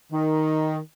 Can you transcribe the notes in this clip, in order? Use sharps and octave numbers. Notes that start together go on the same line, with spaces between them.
D#3